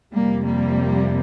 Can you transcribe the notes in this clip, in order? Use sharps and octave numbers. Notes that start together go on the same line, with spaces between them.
F2 C3 F3 G3 A#3
G3 A#3